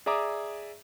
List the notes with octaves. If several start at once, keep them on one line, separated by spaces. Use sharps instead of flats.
G#4 D5 E5 A#5 D6 D#6